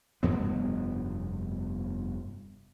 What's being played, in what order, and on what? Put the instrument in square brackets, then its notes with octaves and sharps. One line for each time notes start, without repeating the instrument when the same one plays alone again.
[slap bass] F1 G2 B2 B3